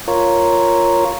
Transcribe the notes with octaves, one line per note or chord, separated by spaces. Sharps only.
F4 A#4 C#5